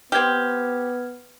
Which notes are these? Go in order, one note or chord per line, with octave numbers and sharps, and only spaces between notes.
B3 C4 G4 F6 G#6